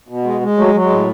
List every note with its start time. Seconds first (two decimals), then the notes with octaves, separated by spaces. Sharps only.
0.08 B2
0.24 G#3
0.41 G#3
0.57 F#3 A3
0.74 F#3
0.82 G#3
0.90 A2